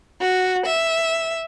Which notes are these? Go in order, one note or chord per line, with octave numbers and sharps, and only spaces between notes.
F#4
E5